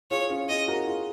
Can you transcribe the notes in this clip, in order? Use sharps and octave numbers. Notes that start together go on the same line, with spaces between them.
F4 G#4 C#5
C#4 F4
F4 G#4 D#5
F#4 A#4
F4 G#4